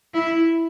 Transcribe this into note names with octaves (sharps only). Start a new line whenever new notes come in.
E4